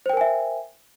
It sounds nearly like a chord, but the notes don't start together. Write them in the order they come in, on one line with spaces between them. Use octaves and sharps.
C5 G5 A#4 G#5 E5